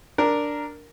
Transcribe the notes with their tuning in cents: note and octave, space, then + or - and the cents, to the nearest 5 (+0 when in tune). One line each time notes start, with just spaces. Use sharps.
D4 +0 A#4 +0